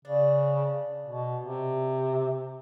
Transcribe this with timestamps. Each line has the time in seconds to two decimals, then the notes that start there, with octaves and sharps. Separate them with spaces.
0.05 C#3 D4
1.06 B2
1.44 C3